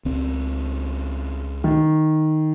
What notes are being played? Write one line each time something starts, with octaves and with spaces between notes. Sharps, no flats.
C#2 C4
D#3